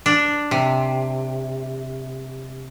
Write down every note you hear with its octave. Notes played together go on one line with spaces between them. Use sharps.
D4
C3